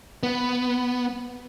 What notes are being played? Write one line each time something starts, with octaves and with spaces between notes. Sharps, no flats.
B3